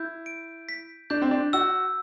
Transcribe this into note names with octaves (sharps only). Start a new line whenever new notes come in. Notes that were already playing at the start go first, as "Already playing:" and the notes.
Already playing: E4 G6
D7
B6
D4 G6
C4
D4
F#4 E6